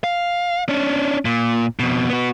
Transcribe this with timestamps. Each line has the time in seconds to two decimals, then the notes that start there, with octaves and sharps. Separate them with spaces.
0.04 F5
0.69 C#4 D4
1.25 A#2
1.79 F2 B2
2.10 B3 F#4